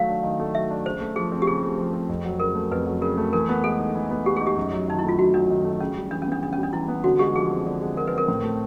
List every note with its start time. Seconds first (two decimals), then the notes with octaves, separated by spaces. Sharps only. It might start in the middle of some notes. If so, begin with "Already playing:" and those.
Already playing: D#3 F#3 A3 F5
0.09 D4
0.23 D#3
0.40 A3
0.55 F#3 E5
0.70 D4
0.86 C#3 C5
1.00 A3
1.16 F3 G#4
1.32 C4
1.42 G4
1.47 C#3 G#4
1.63 A3
1.78 F3
1.93 C4
2.09 F2
2.25 F#3
2.40 C#3 A#4
2.55 A3
2.71 F2 B4
2.86 F#3
3.01 C#3 A#4
3.17 A3
3.33 E3 A#4
3.49 B3
3.64 G#3 A4
3.79 D#4
3.95 E3
4.11 B3
4.26 G#3 G4
4.37 D#4 G#4
4.47 G4
4.57 F#2
4.72 F#3
4.88 D#3 D#4
4.99 E4
5.04 A3 F4
5.19 F#2 F#4
5.34 F#3 D4
5.50 D#3
5.65 A3
5.80 C#3 C#4
5.96 G3
6.11 E3 D4
6.22 C#4
6.27 B3 D4
6.42 C#3 D4
6.53 C#4
6.58 G3 D4
6.73 E3 E4
6.88 B3
7.04 D3 F#4
7.19 G#3 G4
7.36 F3 G#4
7.51 C4
7.66 D3
7.82 G#3
7.97 F3 A#4
8.07 B4
8.13 C4 A#4
8.28 A2
8.44 A3